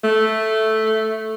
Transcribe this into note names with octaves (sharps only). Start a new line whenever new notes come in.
A3